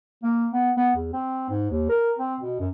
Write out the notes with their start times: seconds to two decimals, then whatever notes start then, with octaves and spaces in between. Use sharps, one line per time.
0.23 A#3
0.53 B3
0.77 B3
0.96 E2
1.13 C4
1.50 G#2
1.70 D#2
1.89 A#4
2.19 C4
2.41 B2
2.60 F#2